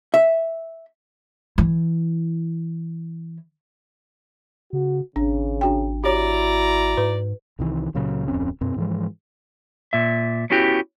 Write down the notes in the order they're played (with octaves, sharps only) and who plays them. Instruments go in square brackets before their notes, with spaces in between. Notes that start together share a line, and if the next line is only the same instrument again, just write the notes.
[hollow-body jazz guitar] E5
[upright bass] E3 E4
[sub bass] C#3 [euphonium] F#4
[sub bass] G#1 [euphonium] C#3 [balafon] D4
[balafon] D4 F#4 G5
[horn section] E4 D5 A#5 [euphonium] F#4 [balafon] G4 C#5
[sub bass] G#2 [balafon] B4
[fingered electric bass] C2 C3 D#3 E3
C#2 A#2 C#3 F#3
D1 F2 C4 C#4
F#2 B2 C4
G#2 E3 F3 G#3
[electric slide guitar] A#2 E5
B3 C#4 E4 F#4 G4